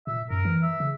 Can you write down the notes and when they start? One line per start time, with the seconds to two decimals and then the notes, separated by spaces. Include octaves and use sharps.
0.07 A#2 E5
0.31 F#2 A#4
0.45 E3
0.62 E5
0.80 C#3